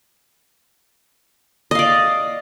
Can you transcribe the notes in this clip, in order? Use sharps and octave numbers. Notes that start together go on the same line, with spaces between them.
D5 D#5 F5